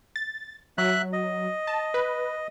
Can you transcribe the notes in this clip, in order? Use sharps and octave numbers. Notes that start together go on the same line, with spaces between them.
A6
F#3 E5 F#6
D#5
A5
B4